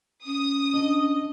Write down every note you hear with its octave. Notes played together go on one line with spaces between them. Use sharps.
C#4 D#6
D4 D#5